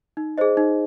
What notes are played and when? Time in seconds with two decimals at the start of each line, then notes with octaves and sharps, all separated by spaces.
0.17 D#4
0.38 G#4 C5 D#5
0.57 D#4